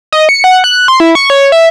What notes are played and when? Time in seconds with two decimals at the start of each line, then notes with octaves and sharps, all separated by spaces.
0.12 D#5
0.29 C#7
0.44 F#5
0.64 F#6
0.88 C6
1.00 E4
1.15 C#6
1.30 C#5
1.52 E5